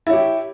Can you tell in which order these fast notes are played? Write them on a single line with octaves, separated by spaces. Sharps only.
E4 C#5 G4